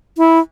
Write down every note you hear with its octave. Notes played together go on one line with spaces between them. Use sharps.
E4